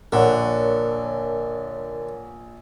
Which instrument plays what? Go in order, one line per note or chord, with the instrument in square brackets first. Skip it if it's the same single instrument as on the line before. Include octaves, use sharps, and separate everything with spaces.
[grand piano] A#1 F#5 [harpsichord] D3 [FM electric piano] A#4 C#5